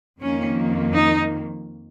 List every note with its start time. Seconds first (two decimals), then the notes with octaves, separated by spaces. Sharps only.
0.20 F2 D#3 A#3 C#4
0.95 D#4